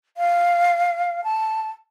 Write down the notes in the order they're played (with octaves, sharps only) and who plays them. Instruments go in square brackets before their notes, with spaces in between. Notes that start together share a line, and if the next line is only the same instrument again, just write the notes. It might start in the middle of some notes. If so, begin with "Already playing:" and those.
[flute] F5
A5